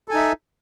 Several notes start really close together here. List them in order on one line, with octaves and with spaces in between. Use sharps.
A4 G#5 D#4 E5